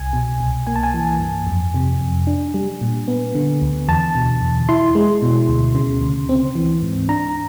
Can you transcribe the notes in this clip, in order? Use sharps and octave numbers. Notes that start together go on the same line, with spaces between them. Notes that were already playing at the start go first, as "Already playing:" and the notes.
Already playing: C2 G#5
B2
C2
A#3 G#5
A5
G#5
E3
G2
F2
C3
F2
D4
G3
A#2
B3
D3
D2
E2 A5
B2
E2
E4 C6
G#3
B2
D2
C#3
D2
C4
E3
G#2
D4 A#5